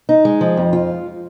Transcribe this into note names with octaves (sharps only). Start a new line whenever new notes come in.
D#4
G#3
F3
F2
F4